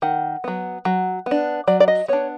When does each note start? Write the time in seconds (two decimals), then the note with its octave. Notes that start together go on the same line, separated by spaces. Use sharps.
0.02 D#3 F#5
0.44 F#3 B3
0.85 F#3
1.26 B3 D4
1.67 F#3 D5
1.80 D5
1.88 D#5
2.08 B3 D4 C#5